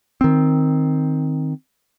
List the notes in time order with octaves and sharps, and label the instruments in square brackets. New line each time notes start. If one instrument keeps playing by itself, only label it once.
[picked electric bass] D#3 C4